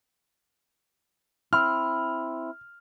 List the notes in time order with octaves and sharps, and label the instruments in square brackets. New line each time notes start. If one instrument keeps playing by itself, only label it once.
[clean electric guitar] C4 E4 [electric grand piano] F6